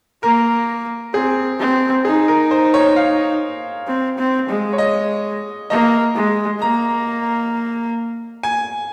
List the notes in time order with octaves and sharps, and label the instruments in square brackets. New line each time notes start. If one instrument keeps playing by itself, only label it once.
[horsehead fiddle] A#3 [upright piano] A#4
[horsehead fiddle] C4 [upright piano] G#4
[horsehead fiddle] C4
[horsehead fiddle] D#4 [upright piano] G#4
[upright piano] A#4
C5
C#5
F5
[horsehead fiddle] C4
C4
G#3
[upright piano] C#5
D#5
[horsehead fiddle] A#3 [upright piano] D#5
[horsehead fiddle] G#3
[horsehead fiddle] A#3 [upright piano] A#5
[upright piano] G#5